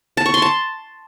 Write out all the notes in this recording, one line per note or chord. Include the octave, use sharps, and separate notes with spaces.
A5
C#6
C6
A5